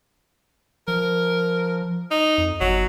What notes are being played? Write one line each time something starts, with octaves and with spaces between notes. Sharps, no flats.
F3 A#4
D#4
F2
G1 F#3